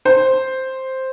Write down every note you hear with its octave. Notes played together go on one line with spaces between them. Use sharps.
C5